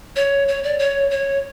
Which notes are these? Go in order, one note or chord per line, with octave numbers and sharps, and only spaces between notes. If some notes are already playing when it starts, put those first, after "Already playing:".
C#5
C#5
D5
C#5
C#5